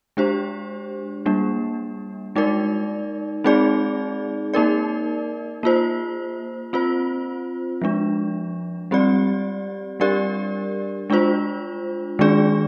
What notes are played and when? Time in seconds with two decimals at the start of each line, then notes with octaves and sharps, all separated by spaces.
0.17 G#3 D4 G4 C5
1.26 G3 A#3 D4
2.36 G#3 D#4 A#4 D5
3.44 G#3 C4 D#4 G#4 D5
4.54 A#3 D#4 A#4 D5
5.63 A#3 F4 C5
6.73 C4 F4 C5
7.82 F3 G#3 D4
8.91 G3 C4 G4 D5
10.00 G3 D4 G4 A#4 D5
11.10 G#3 D4 F4 C5
12.19 D#3 G#3 D4 G#4 D5